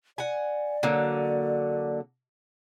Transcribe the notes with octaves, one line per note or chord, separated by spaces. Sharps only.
D5 F#5 G#5
D3 F#3 A#3